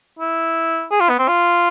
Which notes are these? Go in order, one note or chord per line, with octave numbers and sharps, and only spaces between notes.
E4
G#4
F4
B3
C4
F4